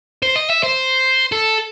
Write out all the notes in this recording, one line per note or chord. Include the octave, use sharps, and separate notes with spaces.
C5
D#5
E5
C5
A4